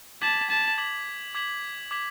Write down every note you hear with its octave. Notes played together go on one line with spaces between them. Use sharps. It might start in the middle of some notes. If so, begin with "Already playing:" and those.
A5 D6 G#6 B6 F#7
A5
D6 G#6 B6 F#7
D6 G#6 B6 F#7
D6 G#6 B6 F#7